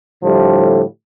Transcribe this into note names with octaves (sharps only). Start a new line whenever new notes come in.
A2 D3 F3 G3 A3